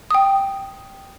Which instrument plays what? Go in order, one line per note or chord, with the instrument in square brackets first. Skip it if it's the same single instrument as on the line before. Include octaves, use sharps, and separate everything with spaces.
[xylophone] G5 D#6